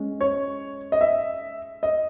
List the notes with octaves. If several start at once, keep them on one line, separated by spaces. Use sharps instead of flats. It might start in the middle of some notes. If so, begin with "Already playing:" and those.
Already playing: G#3 C#4
C#5
D#5
E5
D#5